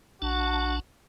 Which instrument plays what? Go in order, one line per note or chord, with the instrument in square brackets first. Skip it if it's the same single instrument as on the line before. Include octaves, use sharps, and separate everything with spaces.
[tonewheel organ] A#1 D4 A5 [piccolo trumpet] F#4